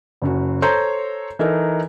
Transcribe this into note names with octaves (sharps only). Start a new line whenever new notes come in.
F#1 F#2 F#4
A4 C5 C#5 A#5 C6 G6
E3 D#4 A4 A#4